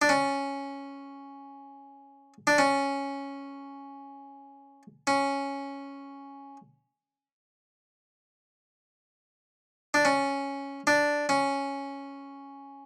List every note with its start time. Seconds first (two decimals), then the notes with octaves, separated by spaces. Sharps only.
0.02 D4
0.09 C#4
2.47 D4
2.58 C#4
5.07 C#4
9.94 D4
10.05 C#4
10.87 D4
11.29 C#4